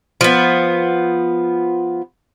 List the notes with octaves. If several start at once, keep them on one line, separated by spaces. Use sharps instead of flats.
F3 B3